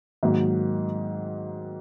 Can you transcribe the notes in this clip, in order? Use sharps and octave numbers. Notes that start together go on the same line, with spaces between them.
G#2 D#3 F#3 A#3